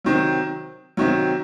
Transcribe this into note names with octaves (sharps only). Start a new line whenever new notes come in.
C3 D#3 F#3
C3 D#3 F#3